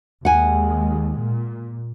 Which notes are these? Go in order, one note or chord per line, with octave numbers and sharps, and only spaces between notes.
D#2 G#3 F#5 G#5
A#2